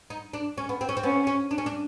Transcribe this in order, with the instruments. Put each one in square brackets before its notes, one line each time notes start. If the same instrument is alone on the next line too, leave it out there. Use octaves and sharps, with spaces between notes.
[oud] D#4
D4
C#4
B3
C4
C#4
C4
[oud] B3 [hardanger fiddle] C#4
[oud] C#4
D4
C#4
D4